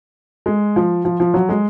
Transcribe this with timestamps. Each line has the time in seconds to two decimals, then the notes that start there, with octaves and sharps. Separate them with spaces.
0.46 G#3
0.76 F3
1.05 F3
1.20 F3
1.34 F#3
1.49 G#3